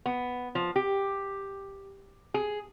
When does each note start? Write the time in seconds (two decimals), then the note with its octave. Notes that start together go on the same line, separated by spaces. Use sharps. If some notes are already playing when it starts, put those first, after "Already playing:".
0.06 B3
0.55 F3
0.76 G4
2.34 G#4